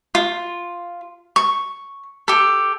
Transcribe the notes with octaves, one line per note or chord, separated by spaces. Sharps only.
F4
C#6
G4 A4